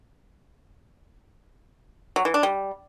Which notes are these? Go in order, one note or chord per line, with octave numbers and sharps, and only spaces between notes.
F#3
E3
D4
G3